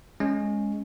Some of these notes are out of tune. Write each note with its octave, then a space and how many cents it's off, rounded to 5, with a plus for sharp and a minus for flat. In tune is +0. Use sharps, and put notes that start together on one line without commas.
G#3 +0 C#4 +0